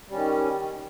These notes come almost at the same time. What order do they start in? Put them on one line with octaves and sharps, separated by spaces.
G3 C#4 D#3